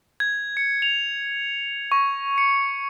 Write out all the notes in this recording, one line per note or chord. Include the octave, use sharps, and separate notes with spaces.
G#6
C#7
F7
C#6
C#7